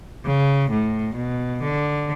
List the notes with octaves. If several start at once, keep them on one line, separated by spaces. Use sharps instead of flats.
C#3
A2
B2
D3